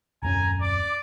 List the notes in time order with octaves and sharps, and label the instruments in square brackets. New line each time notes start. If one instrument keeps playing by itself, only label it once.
[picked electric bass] D#1 F#2 C#4 [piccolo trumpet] G#5 [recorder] A#5
[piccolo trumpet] D5 [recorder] D6